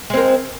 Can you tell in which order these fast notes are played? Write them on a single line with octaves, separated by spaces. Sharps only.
G#3 C4 A#4